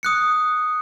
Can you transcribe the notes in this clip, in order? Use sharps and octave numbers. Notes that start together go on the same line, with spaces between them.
D#6 F#6 C#7